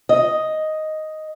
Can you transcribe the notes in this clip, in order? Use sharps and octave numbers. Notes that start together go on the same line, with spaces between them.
D#5